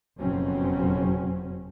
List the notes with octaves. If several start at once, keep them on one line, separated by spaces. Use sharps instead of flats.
F#1 F2 B2 F#3 C4 C#4